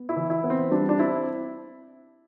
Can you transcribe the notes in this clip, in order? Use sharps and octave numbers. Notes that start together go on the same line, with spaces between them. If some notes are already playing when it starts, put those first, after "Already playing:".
Already playing: B3
E4
E3
E4
B3
C4
G3 D4
D4
C4 E4